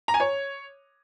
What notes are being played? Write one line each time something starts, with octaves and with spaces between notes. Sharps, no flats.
A#5
G#5
C#5